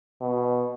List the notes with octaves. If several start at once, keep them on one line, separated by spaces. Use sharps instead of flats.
B2